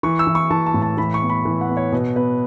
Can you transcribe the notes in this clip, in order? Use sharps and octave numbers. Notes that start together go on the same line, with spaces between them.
E3 C#6
E6
E3
C#6
E3 A5
A5
A2
A5
E3 B5
C#6
B3
B5
E3
F#5
B3
C#5
B2 B4
B3 B4